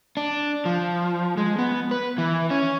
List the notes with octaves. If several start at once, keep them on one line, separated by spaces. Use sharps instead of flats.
D4
F3
G#3
B3
B4
E3
C#4